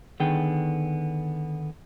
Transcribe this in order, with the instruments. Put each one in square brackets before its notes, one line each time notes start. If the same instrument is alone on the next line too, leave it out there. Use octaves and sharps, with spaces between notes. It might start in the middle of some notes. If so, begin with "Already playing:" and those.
[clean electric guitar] D3 D#3 B3 G#4 G5